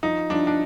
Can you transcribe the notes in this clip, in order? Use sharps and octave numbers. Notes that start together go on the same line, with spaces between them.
F3 D#4
F3 D4
D4